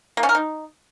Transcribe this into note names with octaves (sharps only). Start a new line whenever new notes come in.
A#3
C#4
A#4
D#4